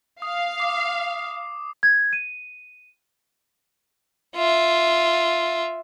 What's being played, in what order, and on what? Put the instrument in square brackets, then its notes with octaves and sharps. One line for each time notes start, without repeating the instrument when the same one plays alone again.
[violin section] F5 [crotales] D#6
[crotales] D6 C7
[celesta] G#6
D#7
[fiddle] F4 E5